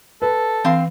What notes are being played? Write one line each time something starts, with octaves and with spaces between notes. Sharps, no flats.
A4 B4
E3 C4 F5